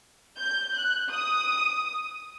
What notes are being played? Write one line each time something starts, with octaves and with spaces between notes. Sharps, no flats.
G6
F#6
D#6